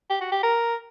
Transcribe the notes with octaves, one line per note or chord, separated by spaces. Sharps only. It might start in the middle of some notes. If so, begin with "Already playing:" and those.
G4
F#4
G4
A#4